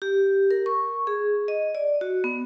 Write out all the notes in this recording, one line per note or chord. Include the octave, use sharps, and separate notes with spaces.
G4
A#4
C#6
G#4
D#5
D5
F#4
B3